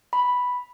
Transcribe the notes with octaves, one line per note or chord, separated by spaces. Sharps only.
B5